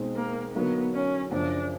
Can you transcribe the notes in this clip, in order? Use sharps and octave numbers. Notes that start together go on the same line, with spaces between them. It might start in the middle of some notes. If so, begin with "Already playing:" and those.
Already playing: B2 G#3 C4 D#4
A#3
D3 F#3 A#3 B3 D#4
C#4
F#2 C#3 F3 D4